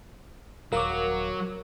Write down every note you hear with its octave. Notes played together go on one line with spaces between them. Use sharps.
D#1 F#3 A#4 F5 D6